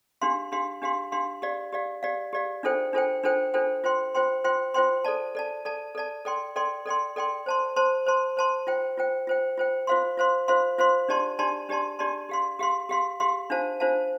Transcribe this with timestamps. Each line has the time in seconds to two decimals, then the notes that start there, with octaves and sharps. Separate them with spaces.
0.22 D4 G4 F5 C6
0.52 D4 G4 F5 C6
0.82 D4 G4 F5 C6
1.12 D4 G4 F5 C6
1.42 G4 D5 F5
1.72 G4 D5 F5
2.03 G4 D5 F5
2.33 G4 D5 F5
2.63 D4 F4 A4 C5 G5
2.93 D4 F4 A4 C5 G5
3.23 D4 F4 A4 C5 G5
3.54 D4 F4 A4 C5 G5
3.84 F4 C5 G5 C6
4.15 F4 C5 G5 C6
4.44 F4 C5 G5 C6
4.74 F4 C5 G5 C6
5.04 A4 D5 A5
5.35 A4 D5 A5
5.65 A4 D5 A5
5.95 A4 D5 A5
6.25 A4 D5 G5 C6
6.56 A4 D5 G5 C6
6.86 A4 D5 G5 C6
7.16 A4 D5 G5 C6
7.46 C5 A5 C6
7.76 C5 A5 C6
8.07 C5 A5 C6
8.37 C5 A5 C6
8.67 F4 C5 G5
8.98 F4 C5 G5
9.27 F4 C5 G5
9.58 F4 C5 G5
9.87 F4 C5 F5 C6
10.18 F4 C5 F5 C6
10.48 F4 C5 F5 C6
10.78 F4 C5 F5 C6
11.09 D4 G4 D5 A5 C6
11.39 D4 G4 D5 A5 C6
11.69 D4 G4 D5 A5 C6
11.99 D4 G4 D5 A5 C6
12.29 G4 F5 C6
12.59 G4 F5 C6
12.89 G4 F5 C6
13.20 G4 F5 C6
13.50 D4 F4 C5 F5 A5
13.80 D4 F4 C5 F5 A5